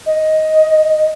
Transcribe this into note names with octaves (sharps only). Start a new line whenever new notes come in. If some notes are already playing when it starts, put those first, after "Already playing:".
D#5